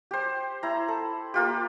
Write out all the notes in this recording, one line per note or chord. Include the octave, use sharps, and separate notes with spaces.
G4 C5
E4 A#5
A4
A#3 F4 G4